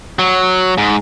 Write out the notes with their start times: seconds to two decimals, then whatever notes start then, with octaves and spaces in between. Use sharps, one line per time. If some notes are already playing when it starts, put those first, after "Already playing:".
0.19 F#3
0.78 G#2